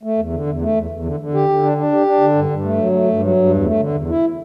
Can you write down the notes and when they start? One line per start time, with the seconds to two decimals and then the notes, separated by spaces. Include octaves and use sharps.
0.03 A3
0.18 E2
0.33 D3
0.47 E2
0.61 A3
0.75 E2
0.90 E2
1.05 D3
1.20 D3
1.34 G4
1.49 D3
1.63 D4
1.78 D4
1.92 G4
2.07 D4
2.21 D3
2.35 G2
2.49 G2
2.65 A3
2.78 F#3
2.92 A3
3.08 G2
3.22 F#3
3.36 G2
3.51 E2
3.65 A3
3.80 D3
3.94 E2
4.09 E4